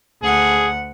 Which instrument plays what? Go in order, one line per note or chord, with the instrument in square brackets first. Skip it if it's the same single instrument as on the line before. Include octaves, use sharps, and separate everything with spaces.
[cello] D2 F#5 [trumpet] G#4